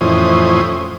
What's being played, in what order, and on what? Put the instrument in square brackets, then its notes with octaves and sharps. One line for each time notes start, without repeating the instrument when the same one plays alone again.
[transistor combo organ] F2 A2 E3 C#4 C5 D#6